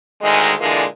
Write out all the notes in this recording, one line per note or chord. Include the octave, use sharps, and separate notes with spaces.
D2 D#3 G#3
A#2 D3 E3 G#3